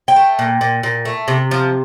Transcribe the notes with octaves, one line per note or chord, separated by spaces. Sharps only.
G5
A3
A#2
A#2
A#2
A3
C3
F3